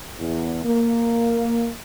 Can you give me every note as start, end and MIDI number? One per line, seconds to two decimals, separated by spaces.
0.19 0.60 40
0.65 1.70 58